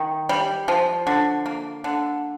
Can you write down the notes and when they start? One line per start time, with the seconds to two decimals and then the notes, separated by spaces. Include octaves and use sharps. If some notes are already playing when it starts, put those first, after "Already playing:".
Already playing: D#3
0.29 G3
0.68 F3
1.07 D3
1.46 A#3
1.84 D3